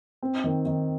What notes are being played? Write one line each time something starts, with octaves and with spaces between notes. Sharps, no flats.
C4
D#3
D#3